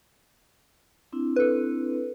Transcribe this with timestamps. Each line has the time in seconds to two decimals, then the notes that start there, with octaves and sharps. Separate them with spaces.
1.12 C4 D4 E4
1.36 A4 B4